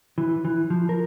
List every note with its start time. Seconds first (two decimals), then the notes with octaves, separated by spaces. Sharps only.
0.18 E3
0.45 E3
0.70 F3
0.89 A#4